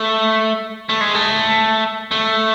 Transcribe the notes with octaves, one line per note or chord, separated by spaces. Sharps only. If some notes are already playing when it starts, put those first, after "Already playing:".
Already playing: A3
A3
G#3
A3
A3